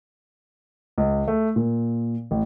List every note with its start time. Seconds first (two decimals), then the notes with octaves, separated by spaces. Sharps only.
0.98 C#2
1.28 A3
1.56 A#2
2.31 A1